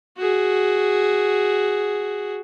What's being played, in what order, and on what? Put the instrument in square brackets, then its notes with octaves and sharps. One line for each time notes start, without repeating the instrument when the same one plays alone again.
[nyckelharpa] F#4 G#4